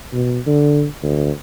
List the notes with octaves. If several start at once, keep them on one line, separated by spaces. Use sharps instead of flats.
B2
D3
D2